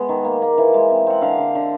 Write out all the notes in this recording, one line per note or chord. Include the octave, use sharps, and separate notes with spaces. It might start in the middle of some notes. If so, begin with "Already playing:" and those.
Already playing: G#3 B3
D#3
A#3
A#3
E3
G#3
C4
C4 F#5
D3 F5
D3
D3